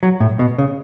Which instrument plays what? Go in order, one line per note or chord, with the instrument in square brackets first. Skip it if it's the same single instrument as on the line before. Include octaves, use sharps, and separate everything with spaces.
[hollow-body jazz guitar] F#3
A2
B2
C#3